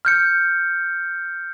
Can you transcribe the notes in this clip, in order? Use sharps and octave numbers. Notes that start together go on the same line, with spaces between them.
F6 G6 C#7